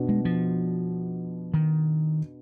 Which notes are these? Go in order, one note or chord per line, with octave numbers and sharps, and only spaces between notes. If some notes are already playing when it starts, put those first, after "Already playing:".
Already playing: B2 B3 D4
G#3
F3
D#3